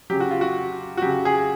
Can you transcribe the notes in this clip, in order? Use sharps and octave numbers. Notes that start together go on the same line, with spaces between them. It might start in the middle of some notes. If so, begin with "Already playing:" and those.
C#3 F#3 G4
F#4
F4
F#4
F#4
C#3 F#3 G4
G#4